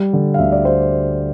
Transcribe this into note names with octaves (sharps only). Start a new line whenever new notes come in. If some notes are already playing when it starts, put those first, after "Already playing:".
Already playing: G3
D3
F5
D2 E5
D5
C5